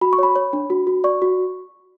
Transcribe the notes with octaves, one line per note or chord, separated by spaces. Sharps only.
F#4 B5
C#6
C#5 B5
C#5
D4
F#4
F#4
D5 C#6
F#4